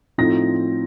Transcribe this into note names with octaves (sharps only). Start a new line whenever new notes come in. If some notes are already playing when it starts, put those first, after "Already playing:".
A2 F3 C4 D#4 A#6